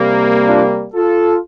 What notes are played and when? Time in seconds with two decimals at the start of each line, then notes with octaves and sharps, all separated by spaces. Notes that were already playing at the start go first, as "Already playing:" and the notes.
Already playing: C3 G3 A#3
0.48 D4 F4
0.94 F4 A4